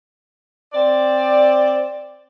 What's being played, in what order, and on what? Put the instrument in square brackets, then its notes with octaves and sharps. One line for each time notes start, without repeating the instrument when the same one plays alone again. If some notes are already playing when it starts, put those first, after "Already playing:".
[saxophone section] C4 D5